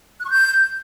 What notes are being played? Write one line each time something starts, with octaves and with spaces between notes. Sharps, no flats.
F#6
C#6
G6